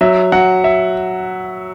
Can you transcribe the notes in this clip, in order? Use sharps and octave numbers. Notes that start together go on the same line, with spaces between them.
F#3 E5
F#3 F#5
E5